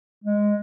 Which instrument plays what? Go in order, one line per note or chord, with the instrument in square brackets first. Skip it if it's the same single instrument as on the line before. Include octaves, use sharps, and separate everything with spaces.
[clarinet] G#3